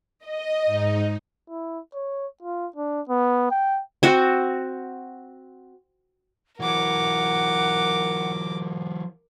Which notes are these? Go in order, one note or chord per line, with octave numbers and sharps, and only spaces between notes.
D#5
G#2 D#4
E4
C#5
F4
D4
B3
G5
C4 F#4
E3 F#3 A#4 F#5 D6